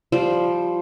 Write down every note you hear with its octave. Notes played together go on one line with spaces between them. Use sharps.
F3 G3 C5